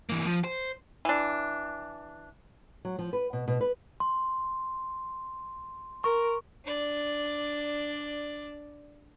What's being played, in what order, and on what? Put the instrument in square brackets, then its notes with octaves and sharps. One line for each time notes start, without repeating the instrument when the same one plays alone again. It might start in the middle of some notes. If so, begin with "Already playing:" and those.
[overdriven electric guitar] E3 A#3
F3
C5
[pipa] E3 D4
[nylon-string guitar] F#3
F3
B4
B2
B2
B4
[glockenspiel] C6
[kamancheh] A#4 [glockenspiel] C#6
[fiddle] D4 D5